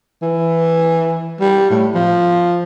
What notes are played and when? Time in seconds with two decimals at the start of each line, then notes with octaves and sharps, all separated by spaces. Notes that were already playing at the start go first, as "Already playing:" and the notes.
0.22 E3
1.40 G3
1.70 A2
1.94 F3